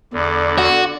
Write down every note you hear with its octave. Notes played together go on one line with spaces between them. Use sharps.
E2 D3 D5
F#4